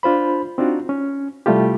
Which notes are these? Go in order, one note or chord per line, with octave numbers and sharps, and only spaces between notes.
D4 F4 C5 B5
C4 D4 D#4 F4 F#4
C#4
C3 G3 A3 E4 F4 G4